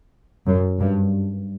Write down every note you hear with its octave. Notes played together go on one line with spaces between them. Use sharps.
F#2
G2